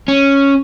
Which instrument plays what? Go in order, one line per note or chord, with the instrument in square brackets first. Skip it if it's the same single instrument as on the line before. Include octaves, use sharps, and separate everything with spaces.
[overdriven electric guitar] C#4